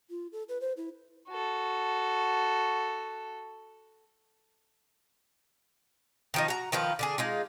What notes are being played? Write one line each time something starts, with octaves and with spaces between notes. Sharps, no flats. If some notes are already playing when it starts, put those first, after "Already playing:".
F4
A4
B4
C5
E4
F#4 A4
D#3 F3 D#4
F#4 A#5
D#3 F3 F4 B4
D3 D4 G#4
G#3 D#4 F4